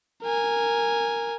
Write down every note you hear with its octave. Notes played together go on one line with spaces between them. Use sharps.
A#4 G#5